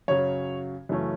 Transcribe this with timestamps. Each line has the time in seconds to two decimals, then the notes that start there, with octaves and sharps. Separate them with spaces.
0.08 F#2 C#3 F#3 C#5
0.89 F#2 C#3 E3 A3 C#4